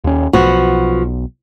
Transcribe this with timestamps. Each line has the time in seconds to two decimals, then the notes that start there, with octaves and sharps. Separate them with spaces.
0.04 D#2 C#4
0.33 B1 F3 B3 F#4